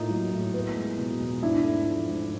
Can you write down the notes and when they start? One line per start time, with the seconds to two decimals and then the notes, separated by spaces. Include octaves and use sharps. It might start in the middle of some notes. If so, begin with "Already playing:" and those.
Already playing: A2 A#3 D#4 F4
0.10 F#3
0.32 A2
0.54 B3
0.76 G#3
0.99 B2
1.20 E2
1.42 G#2 D4 E4
1.64 A3
1.86 F3
2.09 G#2